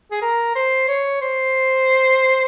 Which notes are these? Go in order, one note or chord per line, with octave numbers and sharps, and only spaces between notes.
G#4
A#4
C5
C#5
C5